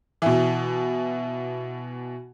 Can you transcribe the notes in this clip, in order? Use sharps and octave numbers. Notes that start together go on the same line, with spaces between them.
B2 E3